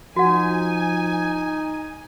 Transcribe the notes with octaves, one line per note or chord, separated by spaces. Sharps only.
F3 D#4 F#4 F#5 G#5